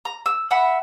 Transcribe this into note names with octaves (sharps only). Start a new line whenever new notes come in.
A#5
E6
E5 F#5 B5